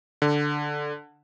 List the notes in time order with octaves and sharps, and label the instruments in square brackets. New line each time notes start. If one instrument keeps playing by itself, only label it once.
[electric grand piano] D3